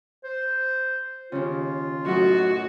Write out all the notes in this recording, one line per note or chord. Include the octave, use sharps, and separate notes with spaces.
C5
D#2 C#3 F4
F#2 A2 D#4 F#4